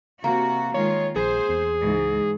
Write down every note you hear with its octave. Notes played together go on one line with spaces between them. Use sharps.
C3 A#3 F#4
D#3 G#3 F4 C#5
A#1 G#4 C5
E2
C#2 G#2 E3